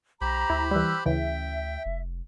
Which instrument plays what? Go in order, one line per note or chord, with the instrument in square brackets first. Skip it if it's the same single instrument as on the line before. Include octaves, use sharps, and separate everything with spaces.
[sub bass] B1 [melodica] G4 C5 B5 [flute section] A#5
[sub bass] D2 [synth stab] E4
[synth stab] E3 G3 [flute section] E6 F#6
[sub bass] D2 [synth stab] C#3 E3 [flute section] E5 [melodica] G5
[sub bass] F1